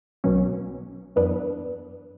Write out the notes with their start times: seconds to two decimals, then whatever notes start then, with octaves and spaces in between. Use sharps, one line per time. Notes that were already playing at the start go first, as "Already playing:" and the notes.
0.24 B1 B2 F#3 C#4
1.16 F#2 E3 B3 D4